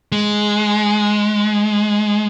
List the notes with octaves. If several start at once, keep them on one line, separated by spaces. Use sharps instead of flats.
G#3